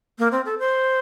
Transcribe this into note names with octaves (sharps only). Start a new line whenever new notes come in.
A#3
C4
A4
C5